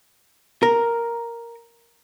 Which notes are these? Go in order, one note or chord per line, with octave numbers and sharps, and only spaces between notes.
A#4